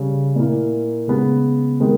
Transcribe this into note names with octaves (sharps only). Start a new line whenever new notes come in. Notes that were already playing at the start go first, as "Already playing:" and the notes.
Already playing: C#3 G3 C#4
A#2 A#3 E4
C#3 G#3 B3
D#3 G#3 B3